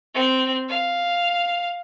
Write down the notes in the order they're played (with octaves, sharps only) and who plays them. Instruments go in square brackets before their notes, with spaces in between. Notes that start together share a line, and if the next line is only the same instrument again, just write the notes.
[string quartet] C4
F5